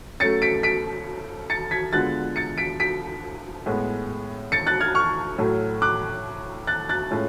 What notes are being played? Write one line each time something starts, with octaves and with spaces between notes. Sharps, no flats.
F#3 A3 C#4 A6 C#7
B6 D7
B6 D7
A6 C#7
G#6 B6
D3 G#3 B3 F4 F#6 A6
A6 C#7
B6 D7
B6 D7
A2 G#3 B3
A6 C#7
F#6 A6
F6 G#6
C#6 F6
A2 F#3 A3
D6 F#6
F#6 A6
F#6 A6
A2 G#3 C#4 F4